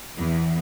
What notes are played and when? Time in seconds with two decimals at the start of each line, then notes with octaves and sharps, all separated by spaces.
0.17 E2